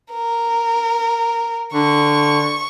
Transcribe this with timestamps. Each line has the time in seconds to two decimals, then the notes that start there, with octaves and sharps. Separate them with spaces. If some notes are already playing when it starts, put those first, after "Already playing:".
0.12 A#4
1.74 D3 C#6